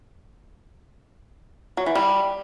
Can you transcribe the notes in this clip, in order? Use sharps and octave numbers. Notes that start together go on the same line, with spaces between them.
F#3
E3
G3